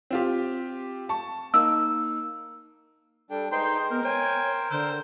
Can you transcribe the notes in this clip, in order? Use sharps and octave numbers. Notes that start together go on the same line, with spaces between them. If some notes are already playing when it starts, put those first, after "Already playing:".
C4 F4 G4
A5 C#6
A#3 D#4 E6
G3 D4 A4 G5
G#3 D#4 B4 C5 G5 C6
B3 A#4
C5 C#5 G5 G#5
D3 C5 E6